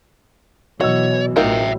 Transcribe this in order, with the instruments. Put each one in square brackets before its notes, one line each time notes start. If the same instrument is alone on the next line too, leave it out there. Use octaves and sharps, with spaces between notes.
[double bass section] B2 E3 [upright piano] F#3 D#5 E6 [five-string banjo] F#4 [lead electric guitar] C#5
[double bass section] A1 [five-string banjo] D#4 F4 A#4 [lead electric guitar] E5 G5